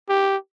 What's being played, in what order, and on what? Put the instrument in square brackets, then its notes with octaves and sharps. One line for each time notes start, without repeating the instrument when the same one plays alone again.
[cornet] G4